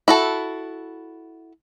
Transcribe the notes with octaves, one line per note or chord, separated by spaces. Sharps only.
E4 F#4 A4